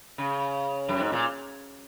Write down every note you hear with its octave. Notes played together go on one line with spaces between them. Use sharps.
C#3
F#2
G#2
A#2